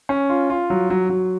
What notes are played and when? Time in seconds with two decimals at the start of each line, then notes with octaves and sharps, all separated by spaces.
0.09 C#4
0.29 F4
0.50 F4
0.70 F#3
0.90 F#3
1.10 F#3